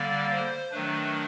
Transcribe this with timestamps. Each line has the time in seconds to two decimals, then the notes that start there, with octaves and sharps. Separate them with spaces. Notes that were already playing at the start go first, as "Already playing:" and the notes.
Already playing: D3 G3 A#3 D5
0.31 C5
0.71 D#3 F#3 A3 D4 B4